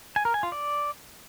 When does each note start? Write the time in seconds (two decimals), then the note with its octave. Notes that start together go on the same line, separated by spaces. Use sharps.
0.16 G#5
0.25 A#4
0.34 G#5
0.43 F4
0.52 D5